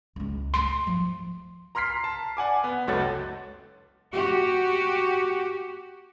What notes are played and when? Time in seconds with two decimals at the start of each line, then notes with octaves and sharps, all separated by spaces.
0.16 C#2 G#3
0.54 A3 C6
0.87 F3
1.75 A#5 C6 F6 B6 C7
2.04 A5
2.37 D5 F#5 G#5 D6
2.64 B3
2.87 F#1 C#2 F#4 A4 C#5 A6
4.13 F#4 G4